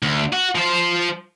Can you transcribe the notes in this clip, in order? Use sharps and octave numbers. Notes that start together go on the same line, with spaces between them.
D2
F#4
F3 C5